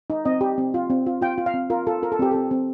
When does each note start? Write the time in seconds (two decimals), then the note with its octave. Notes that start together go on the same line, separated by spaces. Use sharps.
0.10 D#4
0.25 C4 D#5
0.41 G4
0.58 C4
0.74 F4
0.90 C4
1.06 F4
1.22 F4 G5
1.38 F4
1.46 F5
1.54 C4
1.70 F4 A#4
1.87 F4 A4
2.03 F4 A#4
2.12 A4
2.19 C4 G4
2.31 C4 A4
2.51 C4